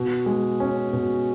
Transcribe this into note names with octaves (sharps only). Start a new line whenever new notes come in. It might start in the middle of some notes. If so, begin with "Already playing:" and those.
Already playing: B2
G#3
C#4
B2